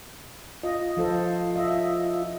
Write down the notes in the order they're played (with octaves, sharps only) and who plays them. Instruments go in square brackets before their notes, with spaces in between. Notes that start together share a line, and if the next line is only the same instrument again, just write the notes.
[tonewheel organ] F4 [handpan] D#5
[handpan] F3 A4 C5
D#5 E5